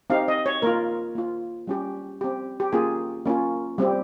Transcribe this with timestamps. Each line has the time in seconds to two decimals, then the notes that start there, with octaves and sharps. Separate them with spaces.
0.10 C4 D#4 G4 F5
0.28 D#5
0.46 C#5
0.62 A#3 F4 A#4
1.15 A#3 F4
1.67 G3 C#4 G4
2.21 C4 G4
2.60 G4
2.73 A#3 C#4 F4 G#4
3.25 A#3 C#4 F4
3.78 G3 C4 G4